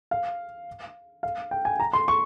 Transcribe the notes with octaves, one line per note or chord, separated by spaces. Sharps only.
F5
F5
G5
G#5
A#5
C6
C#6